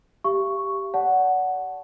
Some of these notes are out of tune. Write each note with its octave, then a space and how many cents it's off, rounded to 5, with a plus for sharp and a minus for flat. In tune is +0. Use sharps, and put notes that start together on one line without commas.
G4 +0 F5 -45 C#6 +0
D5 -40 F#5 +0 A5 +0